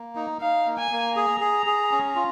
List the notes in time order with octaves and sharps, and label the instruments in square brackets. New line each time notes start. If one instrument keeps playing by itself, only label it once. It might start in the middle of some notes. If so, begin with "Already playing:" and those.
Already playing: [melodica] A#3
D#4
[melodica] D#4 [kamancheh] F5
[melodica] A#3
[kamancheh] G#5
[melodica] A#3
[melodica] G#4 [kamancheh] A#5
[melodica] G#4
G#4
C#4
F4